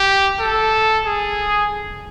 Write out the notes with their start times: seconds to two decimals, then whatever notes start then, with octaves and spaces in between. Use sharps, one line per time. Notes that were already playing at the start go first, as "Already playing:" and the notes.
Already playing: G4
0.39 A4
1.05 G#4